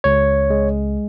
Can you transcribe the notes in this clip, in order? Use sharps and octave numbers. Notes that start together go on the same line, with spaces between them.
C#2 C#5
G#3